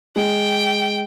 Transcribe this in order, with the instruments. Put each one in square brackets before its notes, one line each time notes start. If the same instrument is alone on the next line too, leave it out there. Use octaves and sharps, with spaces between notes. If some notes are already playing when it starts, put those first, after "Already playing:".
[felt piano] G#3 [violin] G5